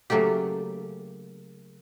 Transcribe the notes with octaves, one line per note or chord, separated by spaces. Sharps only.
C#3 F#3 A3 A#3 G4